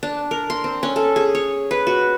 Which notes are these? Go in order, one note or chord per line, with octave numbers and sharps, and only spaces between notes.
D4
A#4
C6
C4
C#4
A4
G#4
C#5
B4
F#4